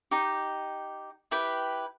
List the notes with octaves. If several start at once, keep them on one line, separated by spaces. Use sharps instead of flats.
D#4 G4
E4 G4 B4 G5